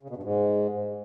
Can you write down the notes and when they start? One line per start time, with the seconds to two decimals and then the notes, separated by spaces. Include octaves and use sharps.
0.03 C#3
0.10 B2
0.16 G2
0.23 G#2